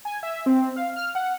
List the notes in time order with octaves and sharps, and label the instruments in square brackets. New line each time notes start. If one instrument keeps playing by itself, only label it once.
[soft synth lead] G#5
E5
C4
F5
F6
F#5